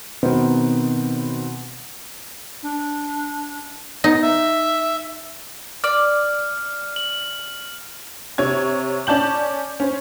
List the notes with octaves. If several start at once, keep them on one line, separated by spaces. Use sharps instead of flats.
B2 D#3 B3 C4
D4
B3 D#4
E5
D5 F6
F#7
C3 C#5 G#6
C#4 D5 A5 G6 F#7
C#4 C5